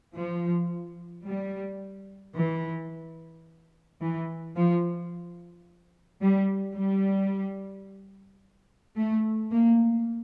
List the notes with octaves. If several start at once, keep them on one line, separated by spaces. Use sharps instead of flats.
F3
G3
E3
E3
F3
G3
G3
A3
A#3